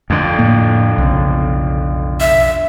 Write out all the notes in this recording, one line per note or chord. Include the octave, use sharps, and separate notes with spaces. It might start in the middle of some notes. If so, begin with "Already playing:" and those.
F2 D3
A2 A#3
B1 C#3
E5